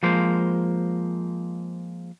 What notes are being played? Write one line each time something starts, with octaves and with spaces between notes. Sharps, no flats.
F3 G#3 A#3 C5